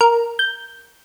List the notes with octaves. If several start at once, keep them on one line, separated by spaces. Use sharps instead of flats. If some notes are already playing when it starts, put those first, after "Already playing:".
A#4
G6